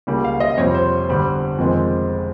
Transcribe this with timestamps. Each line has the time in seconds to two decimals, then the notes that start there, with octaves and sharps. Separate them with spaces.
0.07 C#2 C#3 G3 A#3
0.24 F5
0.40 D#5
0.57 F2 C3 G3 C4 C#5
0.75 C5
1.08 G1 G2 G3 C4
1.58 F2 C3 D#3 G#3 C4